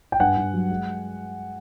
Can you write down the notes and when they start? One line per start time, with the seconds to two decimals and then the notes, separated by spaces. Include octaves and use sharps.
0.12 G5
0.20 G2 F#5 G#5
0.37 G2
0.54 F#3
0.69 G#3